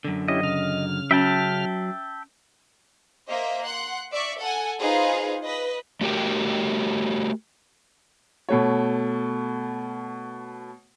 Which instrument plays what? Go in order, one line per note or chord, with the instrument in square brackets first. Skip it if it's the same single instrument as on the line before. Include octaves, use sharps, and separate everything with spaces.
[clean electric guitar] F#2 D3
[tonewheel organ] C#4 E4 G4 [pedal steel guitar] D#5
[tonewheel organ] C#3 F6
[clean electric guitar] F#3 [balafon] C#4 [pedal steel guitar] E5 G5 A5
[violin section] A#3 C5 D#5 E5
F#5 C6 F#6
D5 E5 C#6
A4 F#5 G#5
D#4 F4 G#4 B4 C5 F5
B4 D#5
[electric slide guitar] A3 F#4 G4 A#4 G5
[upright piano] B2 A3 C#5